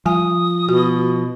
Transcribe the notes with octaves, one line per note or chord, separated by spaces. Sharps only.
F3 G3 G#5 D#6
B2 F#4